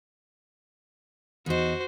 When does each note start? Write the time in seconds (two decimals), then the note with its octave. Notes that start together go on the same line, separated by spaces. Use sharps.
1.46 E2 D#4 F#4 C5